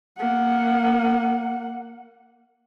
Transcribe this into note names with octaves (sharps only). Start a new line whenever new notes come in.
A#3 F#5